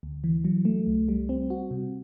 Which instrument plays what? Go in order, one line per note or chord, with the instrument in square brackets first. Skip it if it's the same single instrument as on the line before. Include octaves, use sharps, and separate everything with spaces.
[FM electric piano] D2
E3
F#3
A3
C2
G3
C4
F#4
C3